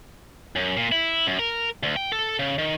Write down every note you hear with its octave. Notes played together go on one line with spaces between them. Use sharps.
F#2
A#2
E4
F#2
A#4
D2
G5
A4
C#3
D#3